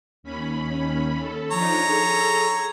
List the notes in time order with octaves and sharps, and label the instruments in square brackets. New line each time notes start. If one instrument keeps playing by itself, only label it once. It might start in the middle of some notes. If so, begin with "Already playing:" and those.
[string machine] D#2 C#4 B5
A4
[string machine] F3 D4 D#4 [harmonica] C#5 A#5
[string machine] G#4 A4